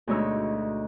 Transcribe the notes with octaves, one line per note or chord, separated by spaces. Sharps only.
D2 B2 G#3 D#4 C#5 E6